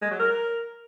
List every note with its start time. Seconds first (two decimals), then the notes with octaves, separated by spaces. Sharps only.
0.02 G#3
0.11 F#3
0.20 A#4